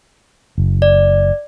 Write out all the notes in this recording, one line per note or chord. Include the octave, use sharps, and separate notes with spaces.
F#1
D5